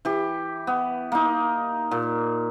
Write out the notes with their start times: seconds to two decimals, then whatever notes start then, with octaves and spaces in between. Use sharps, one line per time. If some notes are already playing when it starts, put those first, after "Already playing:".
0.05 E3 G4
0.67 B3
1.12 A#3 D#4
1.91 A#2